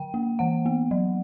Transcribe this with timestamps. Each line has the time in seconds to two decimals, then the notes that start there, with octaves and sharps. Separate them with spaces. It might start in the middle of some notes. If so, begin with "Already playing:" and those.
Already playing: D3 G5
0.14 A#3
0.39 E3 F#5
0.66 B3
0.91 F#3